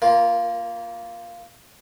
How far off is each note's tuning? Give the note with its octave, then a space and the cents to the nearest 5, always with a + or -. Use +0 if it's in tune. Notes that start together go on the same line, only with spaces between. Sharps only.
A#3 -10 F4 -10 A#4 +25